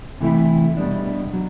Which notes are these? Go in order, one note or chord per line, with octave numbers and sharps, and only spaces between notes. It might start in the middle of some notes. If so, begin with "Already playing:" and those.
C3 E3 A3 E4
B2 G3 B3 D4
F#3